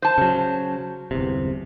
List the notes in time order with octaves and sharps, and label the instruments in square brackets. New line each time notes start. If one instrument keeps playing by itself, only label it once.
[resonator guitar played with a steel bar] C5 A5
[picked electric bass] C#3 F#3
G1 E2 C3